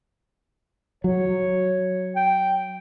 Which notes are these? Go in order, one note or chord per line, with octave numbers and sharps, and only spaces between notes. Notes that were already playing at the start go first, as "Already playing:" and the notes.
F#3 C#5
G5